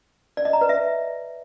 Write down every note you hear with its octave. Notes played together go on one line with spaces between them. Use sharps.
D5
D#5
A#5
B4
E5